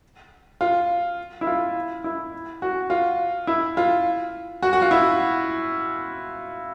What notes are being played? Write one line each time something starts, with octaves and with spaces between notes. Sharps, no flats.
F4
E4
F4
E4
F#4
F4
E4
F4
F#4
F#4
F4
E4